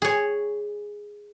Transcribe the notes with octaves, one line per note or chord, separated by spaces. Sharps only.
G#4 C#5